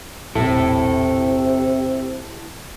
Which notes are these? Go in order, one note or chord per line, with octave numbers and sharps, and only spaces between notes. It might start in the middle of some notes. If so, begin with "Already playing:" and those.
E1 A#1 C3 E4 A4